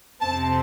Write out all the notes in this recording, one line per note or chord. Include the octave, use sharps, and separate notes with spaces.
F2 C3 F3 C4 A5